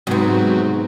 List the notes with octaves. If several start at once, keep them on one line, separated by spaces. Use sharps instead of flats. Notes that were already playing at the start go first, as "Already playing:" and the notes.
G#2 C3 F#3 B3